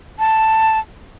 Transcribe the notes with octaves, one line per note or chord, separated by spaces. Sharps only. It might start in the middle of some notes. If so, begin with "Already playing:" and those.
A5